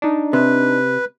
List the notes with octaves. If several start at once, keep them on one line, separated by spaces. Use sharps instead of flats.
D4 D#4
C3 B4